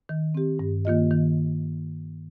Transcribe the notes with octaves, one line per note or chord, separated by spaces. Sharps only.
D#3
C4 G4
G2
D#3 A#3 F4 D#5
D#3